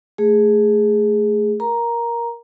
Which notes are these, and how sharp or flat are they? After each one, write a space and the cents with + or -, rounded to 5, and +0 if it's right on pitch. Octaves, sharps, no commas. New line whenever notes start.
A3 +0 G#4 +0
A#4 +10 A#5 +5